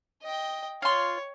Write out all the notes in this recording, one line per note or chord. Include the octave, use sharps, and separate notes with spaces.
D#5 G5
F4 C#5 C6